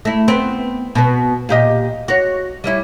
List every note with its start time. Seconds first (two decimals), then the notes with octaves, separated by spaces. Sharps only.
0.05 A3 E4
0.28 B3 C4
0.95 B2 B3
1.49 A#2 G4 D#5
2.08 F#4 C#5
2.64 G3 C#4 E4